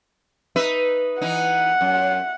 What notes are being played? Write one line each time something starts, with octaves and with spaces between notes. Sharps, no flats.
D#4 B4 E5
E3 D#4 F#5
F#2